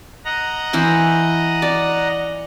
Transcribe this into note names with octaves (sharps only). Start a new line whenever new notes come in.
D#5 F#5 A#5
E3 E4 C5
D5